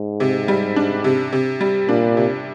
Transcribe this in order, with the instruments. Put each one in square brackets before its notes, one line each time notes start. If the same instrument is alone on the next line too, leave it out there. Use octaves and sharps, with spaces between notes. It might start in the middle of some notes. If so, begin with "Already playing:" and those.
Already playing: [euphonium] G#2
[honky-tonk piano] C3
G3
D4
C3
C3
G3
[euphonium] A#2 [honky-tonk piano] D4
[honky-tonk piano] C3